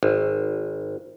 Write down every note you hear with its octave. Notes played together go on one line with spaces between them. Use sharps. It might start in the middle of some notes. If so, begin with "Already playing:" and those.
G#1